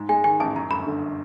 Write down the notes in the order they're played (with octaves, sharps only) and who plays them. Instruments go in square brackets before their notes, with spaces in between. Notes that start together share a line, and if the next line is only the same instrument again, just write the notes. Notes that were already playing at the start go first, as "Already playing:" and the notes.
Already playing: [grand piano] G#2
[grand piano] G#3 [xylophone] G#5
[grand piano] D#3 [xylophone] G#5
[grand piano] A1 [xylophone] A5
[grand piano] F#2 [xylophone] A#5
[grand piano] G1 [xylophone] B5
[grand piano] D3